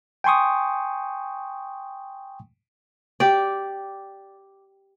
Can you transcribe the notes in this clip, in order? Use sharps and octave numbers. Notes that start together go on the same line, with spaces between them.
G5 G#5 C6 C#6 D#6
G4 D5